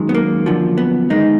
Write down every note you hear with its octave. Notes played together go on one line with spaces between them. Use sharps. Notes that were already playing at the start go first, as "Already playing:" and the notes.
Already playing: F#2 D#3 G#3
B3
A#3
F#2 D3 F3
B3
G#2 D#3 G#3 D#4